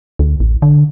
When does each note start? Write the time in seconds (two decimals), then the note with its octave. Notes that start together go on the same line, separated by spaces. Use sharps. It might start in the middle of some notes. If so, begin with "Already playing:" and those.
0.19 D2
0.40 A1
0.62 D3